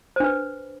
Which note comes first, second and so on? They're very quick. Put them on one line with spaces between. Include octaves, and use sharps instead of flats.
C5 D4 B4